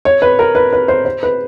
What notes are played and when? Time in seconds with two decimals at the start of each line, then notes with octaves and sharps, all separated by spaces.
0.05 C#5
0.22 B4
0.39 A#4
0.55 B4
0.73 B4
0.88 C5
1.05 C5
1.23 B4